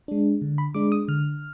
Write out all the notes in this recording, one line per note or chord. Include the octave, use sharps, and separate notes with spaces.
G#3 D4
D3
B5
G#3 D4 D6
D#6
D3 F6